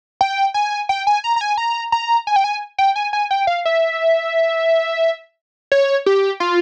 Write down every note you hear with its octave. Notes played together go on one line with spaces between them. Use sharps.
G5
G#5
G5
G#5
A#5
A#5
G#5
A#5
A#5
G#5
G5
G#5
G5
G#5
G#5
G5
F5
E5
C#5
G4
F4